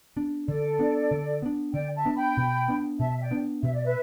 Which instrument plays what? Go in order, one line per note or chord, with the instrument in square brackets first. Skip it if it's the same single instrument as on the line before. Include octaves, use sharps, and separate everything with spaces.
[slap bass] B3 D4
[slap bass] D3 [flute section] A4 D5
[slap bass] B3 D4
D3
B3 D4
[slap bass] D3 [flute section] D5 G5
[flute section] E5 A5
[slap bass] B3 D4
[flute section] G5 B5
[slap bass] B2
B3 D4
[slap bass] B2 [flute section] E5 A5
[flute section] E5
D5 G5
[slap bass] B3 D4
[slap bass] B2 [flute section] E5
[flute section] D5
B4 E5